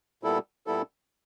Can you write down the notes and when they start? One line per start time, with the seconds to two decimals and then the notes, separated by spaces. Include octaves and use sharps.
0.23 A#2 G3 B3 E4 A4
0.67 A#2 G3 B3 E4 A4